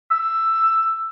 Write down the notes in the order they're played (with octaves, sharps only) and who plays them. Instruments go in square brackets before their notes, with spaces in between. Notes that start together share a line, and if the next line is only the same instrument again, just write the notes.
[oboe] E6